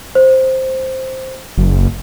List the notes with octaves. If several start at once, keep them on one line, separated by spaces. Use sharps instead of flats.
C5
F#1